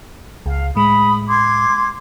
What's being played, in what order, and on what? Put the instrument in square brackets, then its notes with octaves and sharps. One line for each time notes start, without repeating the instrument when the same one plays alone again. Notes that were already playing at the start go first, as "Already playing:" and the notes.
[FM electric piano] C#2 [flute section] F5
[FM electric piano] A2 G#3 [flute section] B5 D#6
[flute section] C6 D6 G#6